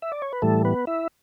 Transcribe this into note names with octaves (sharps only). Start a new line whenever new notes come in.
E5
D5
C#5
B4
A2 E3 G3 A3 A4
B3 B4
E4 E5